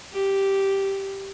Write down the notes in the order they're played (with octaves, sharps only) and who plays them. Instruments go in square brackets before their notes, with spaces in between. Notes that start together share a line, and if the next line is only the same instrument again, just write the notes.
[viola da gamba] G4